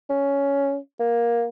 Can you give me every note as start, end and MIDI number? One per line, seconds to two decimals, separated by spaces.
0.10 0.77 61
1.00 1.46 58